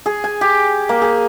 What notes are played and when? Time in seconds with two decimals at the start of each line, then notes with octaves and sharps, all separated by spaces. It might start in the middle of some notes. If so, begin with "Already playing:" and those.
0.06 G#4
0.24 G#5
0.41 G4
0.89 A#3
1.02 G#4